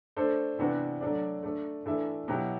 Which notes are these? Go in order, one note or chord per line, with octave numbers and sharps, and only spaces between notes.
A3 D4 A4 C5
C3 E3 B3 D4 F#4
F#3 A3 D4 A4 D5
A3 D4 A4
E3 A3 D4 A4 E5
B2 F#3 B3 E4 G4